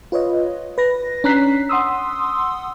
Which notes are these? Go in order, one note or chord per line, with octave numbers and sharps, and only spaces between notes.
F4 B4 C#5 D#5
B4 A#6
C#4 D4 A#5 F#6 B6 C7
F#5 C6 D#6 E6